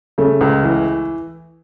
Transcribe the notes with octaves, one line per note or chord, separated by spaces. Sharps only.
C#3 A3
C#2
E3